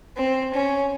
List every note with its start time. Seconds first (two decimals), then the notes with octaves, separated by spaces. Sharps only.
0.16 C4
0.54 C#4